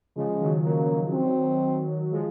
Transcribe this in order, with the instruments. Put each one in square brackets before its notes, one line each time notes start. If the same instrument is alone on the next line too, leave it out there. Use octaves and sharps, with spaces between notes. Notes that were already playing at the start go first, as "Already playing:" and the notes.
[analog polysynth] C#3 F3 [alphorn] G#3
[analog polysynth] D#3 F#3
[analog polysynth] D#3 F#3 [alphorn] A#3
[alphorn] C4
[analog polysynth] F3 G#3